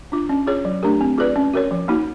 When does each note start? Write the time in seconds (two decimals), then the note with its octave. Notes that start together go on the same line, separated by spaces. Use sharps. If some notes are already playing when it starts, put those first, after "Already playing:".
0.12 D4 F4
0.29 C#4
0.47 F4 G#4 C#5
0.65 F#3
0.83 A3 D4 G4 A#4
1.01 C4
1.18 F4 G#4 B4 D5
1.36 C#4
1.54 F#4 A#4 C#5
1.71 F3
1.88 A#3 D#4 F#4